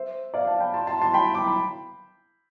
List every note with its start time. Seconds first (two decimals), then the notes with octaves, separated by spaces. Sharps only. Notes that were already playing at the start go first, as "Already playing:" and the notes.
Already playing: C5 E5
0.34 D5 F5
0.47 F5 A5
0.60 G5 B5
0.74 A5 C6
0.87 A5 C6
1.02 A5 C6
1.14 G5 B5
1.34 B5 D6
1.47 B5